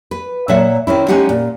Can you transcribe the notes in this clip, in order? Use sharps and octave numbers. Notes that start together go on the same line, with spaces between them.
B4
A#2 F#3 E5 F#5
D#3 C4 C#4 E4
G#3 C#4 D#4 G4 F#5
A#2